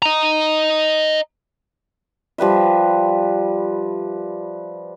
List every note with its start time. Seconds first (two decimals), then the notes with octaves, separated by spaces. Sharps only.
0.02 D#5 A#5
2.38 F3 G3 B4 E5